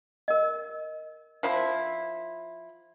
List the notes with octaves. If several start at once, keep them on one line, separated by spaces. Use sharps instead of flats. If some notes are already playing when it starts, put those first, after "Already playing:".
A#4 D#5
F3 E4